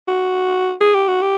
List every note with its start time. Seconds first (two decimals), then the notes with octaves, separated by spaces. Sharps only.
0.08 F#4
0.81 G#4
0.94 G4
1.08 F#4
1.22 G4